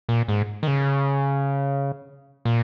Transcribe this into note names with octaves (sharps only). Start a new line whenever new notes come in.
A#2
G#2
D#3
C#3
A#2